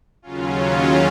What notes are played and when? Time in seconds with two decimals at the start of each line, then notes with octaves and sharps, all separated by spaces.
0.22 D#2 C#3 F#3 C#4 F4